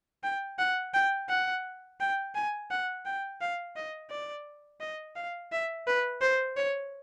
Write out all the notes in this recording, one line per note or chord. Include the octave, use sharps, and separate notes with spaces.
G5
F#5
G5
F#5
G5
G#5
F#5
G5
F5
D#5
D5
D#5
F5
E5
B4
C5
C#5